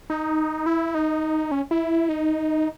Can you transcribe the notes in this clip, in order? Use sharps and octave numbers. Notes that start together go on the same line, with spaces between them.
D#4
E4
D#4
C#4
E4
D#4